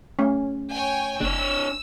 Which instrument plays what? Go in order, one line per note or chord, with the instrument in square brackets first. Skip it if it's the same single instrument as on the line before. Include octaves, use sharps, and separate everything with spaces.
[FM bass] A3 [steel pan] C#4
[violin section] C#5 G5 G#5
[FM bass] F#1 [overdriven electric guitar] D4 C#5 [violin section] E6